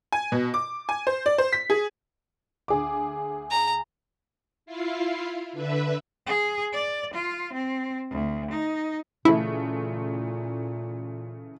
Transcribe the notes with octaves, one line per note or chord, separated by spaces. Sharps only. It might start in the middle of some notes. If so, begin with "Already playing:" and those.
G#5
B2
D6
G#5
C5
D5
C5
B6
G#4
D2 G#4 D6
A#5
E4 F4 F5
D3 B4 E5
G#4
D5
F4
C4
D2
D#4
A#2 C#3 E3 A3 E4